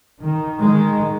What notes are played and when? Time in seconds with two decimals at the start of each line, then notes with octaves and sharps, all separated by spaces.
0.22 D#3
0.61 D#3 G#3